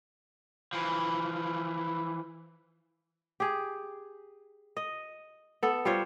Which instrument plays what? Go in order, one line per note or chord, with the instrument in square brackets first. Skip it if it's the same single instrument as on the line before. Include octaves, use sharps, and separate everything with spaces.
[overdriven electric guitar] E3 F3
[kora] G4 G#4
D#5
B3 A4
G3 F4 C5 C#5